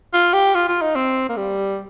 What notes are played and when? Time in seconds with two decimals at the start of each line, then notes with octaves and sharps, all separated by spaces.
0.13 F4
0.33 G4
0.55 F4
0.68 F4
0.81 D#4
0.96 C4
1.29 A#3
1.37 G3